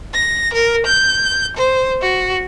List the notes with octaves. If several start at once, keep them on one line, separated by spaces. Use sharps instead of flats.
A#6
A#4
G6
C5
F#4